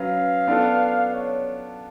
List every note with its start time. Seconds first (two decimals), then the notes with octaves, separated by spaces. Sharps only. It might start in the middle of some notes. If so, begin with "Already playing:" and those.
Already playing: F#3 C#4 B4 F5
0.48 B3 D4 F4 A4
1.13 C#5